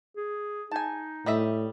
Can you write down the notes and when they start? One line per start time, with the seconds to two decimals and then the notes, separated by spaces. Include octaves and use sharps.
0.17 G#4
0.71 D#4 G#5 A5
1.26 A2 G3 D#5 E5